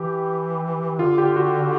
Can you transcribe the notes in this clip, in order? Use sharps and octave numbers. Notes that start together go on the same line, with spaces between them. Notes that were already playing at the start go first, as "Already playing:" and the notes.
Already playing: E3 G4
D3 F4
G4
F#4